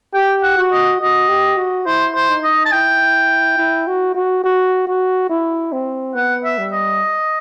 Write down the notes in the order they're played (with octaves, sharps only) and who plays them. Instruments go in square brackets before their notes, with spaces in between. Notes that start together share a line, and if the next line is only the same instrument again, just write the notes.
[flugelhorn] G4 [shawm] G5
[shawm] F#5
[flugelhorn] F#4
[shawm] D#5
[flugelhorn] F#4 [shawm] D#5
[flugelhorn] G4
F#4
[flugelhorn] E4 [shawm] C5
[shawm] C5
[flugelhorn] D#4
[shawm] D#5
A5
[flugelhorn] E4 [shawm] G5
[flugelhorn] E4
F#4
F#4
F#4
F#4
E4
C4
[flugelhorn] B3 [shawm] F#5
[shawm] E5
[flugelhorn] G3
[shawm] D#5